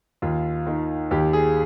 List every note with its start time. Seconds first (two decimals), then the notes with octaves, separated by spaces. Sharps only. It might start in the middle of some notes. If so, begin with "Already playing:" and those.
0.22 D#2 F4
0.66 D#3
1.11 D#2 G4
1.33 G#4